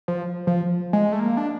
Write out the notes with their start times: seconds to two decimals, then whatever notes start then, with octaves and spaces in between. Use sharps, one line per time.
0.08 F3
0.47 F3
0.93 G#3
1.12 A3
1.20 A#3
1.37 D4